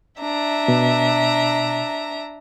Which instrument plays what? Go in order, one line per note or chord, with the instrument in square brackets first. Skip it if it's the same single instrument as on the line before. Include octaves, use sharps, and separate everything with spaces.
[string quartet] D4 E5 A#5
[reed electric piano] B2